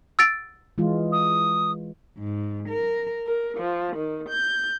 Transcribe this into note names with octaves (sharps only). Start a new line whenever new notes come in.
E6 A6 D7
E3 G#3 F4
D#6
G#2
A#4
A#4
F3
D#3
G6